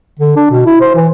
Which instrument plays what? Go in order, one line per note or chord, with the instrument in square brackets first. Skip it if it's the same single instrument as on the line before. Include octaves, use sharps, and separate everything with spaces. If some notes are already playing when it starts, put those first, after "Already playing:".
[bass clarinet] D3
D4
B2
E4
C5
E3